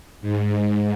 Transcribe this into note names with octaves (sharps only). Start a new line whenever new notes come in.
G#2